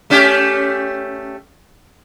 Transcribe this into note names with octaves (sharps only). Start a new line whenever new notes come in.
A3 C#4 G4